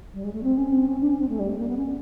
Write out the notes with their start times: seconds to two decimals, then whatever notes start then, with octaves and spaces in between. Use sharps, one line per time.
0.14 G3
0.24 G#3
0.33 A3
0.43 C4
0.57 C#4
0.72 C4
0.87 C#4
1.00 D4
1.11 C#4
1.20 C4
1.29 A3
1.39 G3
1.49 A3
1.58 A#3
1.68 B3
1.77 C#4